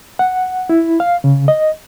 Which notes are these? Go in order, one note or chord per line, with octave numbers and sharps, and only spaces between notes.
F#5
E4
F5
C#3
D#5